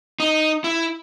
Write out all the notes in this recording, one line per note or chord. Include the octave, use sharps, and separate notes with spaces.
D#4
E4